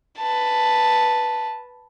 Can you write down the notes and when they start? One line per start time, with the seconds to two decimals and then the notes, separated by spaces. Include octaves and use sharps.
0.18 B4 A5